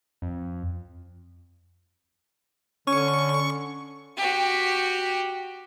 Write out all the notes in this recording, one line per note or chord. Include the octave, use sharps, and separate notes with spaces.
F2
D3 C#4 C#6
F#4 G4